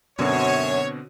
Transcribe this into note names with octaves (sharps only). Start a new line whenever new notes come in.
F#2 B2 D3 C4 C#5